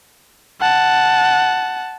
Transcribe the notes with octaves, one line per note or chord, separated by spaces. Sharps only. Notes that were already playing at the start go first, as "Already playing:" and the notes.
F#5 A5